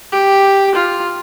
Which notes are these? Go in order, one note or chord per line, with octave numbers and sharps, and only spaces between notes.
G4
F4